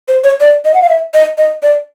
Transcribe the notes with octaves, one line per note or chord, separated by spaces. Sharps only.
C5
C#5
D5
D#5
F#5
F5
E5
D#5
D#5
D5